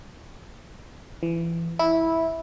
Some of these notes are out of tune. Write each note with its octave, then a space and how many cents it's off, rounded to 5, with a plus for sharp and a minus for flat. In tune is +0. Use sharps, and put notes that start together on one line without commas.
E3 +25
E4 -10